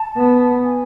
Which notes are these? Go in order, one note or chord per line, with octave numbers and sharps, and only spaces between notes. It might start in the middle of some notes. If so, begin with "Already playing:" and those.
Already playing: A5
B3
G#5